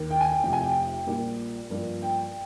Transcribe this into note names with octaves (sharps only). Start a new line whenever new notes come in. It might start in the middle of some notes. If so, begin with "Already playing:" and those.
Already playing: D#2 D#3 A#3
G5
G#5
G5
F1 F2 C3 G5
G#5
G5
A#1 A#2 G3 A#3
G2 F3 A#3
G5